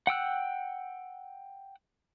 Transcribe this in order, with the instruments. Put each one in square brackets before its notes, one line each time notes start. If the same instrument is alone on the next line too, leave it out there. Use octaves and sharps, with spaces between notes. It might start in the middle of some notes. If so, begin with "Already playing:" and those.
[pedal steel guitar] F#5 G5 E6 F#6